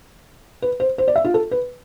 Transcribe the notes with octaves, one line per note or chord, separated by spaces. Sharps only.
B4
C5
C5
D5
E5
F4
A4
B4